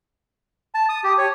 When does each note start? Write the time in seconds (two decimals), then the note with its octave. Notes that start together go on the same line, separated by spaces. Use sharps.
0.74 A5
0.89 D#6
1.04 G4
1.18 C#5